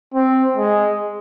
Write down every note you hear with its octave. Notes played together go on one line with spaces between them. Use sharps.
C4
G#3